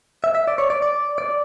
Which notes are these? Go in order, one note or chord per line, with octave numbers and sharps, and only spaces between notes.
E5
E5
D5
C#5
D5
D5
D5